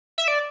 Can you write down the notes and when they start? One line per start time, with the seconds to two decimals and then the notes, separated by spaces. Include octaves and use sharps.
0.18 E5
0.28 D5